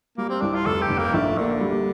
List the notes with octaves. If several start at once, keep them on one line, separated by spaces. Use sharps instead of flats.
G3 A#3
C4
C2 D4
F4
F1 A4
G4
F1
A#3
A#1 A3
D3 A#3
G3